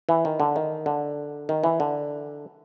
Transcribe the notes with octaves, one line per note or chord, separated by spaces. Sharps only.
E3
D#3
D3
D#3
D3
D#3
E3
D3